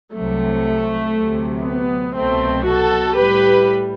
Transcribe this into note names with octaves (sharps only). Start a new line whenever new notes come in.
C2 C3 F#3 A3
D2 C3 F#3
B3
C2 B2 F#3 A3 C4
F#4 A4
A2 G3 G4 B4